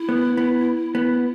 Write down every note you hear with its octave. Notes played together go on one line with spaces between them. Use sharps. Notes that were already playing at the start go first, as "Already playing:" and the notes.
Already playing: E4
B3
B3
B3